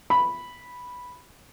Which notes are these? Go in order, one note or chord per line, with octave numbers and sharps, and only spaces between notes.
B5